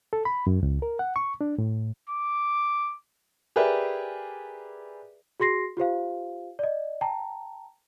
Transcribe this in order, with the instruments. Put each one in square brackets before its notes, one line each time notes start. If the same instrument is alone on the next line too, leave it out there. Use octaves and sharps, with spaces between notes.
[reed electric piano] A4
B5
F#2
C#2
A#4
F#5
C#6
D4
A2
[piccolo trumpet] D6
[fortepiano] G4 G#4 A#4 B4 D5 E5
[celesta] F#4 G#4 C6 A#6 C7
F4 G4 C5 F5
D5 D#5
G5 A5 A#5